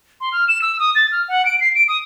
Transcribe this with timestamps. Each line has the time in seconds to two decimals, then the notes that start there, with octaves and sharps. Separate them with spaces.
0.21 C6
0.32 F6
0.48 E7
0.62 E6
0.79 D#6
0.95 A6
1.12 F6
1.28 F#5
1.45 D7
1.60 C7
1.75 D7
1.88 D#6